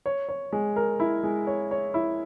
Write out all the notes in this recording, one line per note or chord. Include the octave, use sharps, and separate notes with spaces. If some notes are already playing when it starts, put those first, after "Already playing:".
C#5
C#5
G#3
A#4
E4
G#3
C#5
C#5
E4